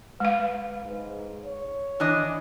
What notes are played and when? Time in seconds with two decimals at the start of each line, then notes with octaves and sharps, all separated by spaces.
0.20 G#3 B4 F5
0.85 G#2
1.44 C#5
2.00 E3 D4 D#5